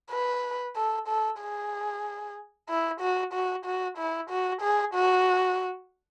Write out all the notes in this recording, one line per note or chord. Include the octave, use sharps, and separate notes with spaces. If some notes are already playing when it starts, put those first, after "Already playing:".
B4
A4
A4
G#4
E4
F#4
F#4
F#4
E4
F#4
G#4
F#4